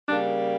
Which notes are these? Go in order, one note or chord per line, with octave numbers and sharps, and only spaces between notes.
C#3 G3 A#3 D4